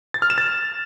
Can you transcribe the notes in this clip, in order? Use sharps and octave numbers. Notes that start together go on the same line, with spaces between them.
A6
F6
E7
A6